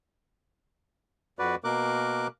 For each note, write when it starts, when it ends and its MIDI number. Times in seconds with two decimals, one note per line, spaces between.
1.39 1.55 41
1.39 1.55 66
1.39 1.55 71
1.39 1.55 74
1.64 2.27 47
1.64 2.27 58
1.64 2.27 70
1.64 2.27 86
1.64 2.27 90